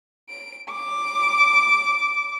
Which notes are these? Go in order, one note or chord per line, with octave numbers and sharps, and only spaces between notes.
D7
D6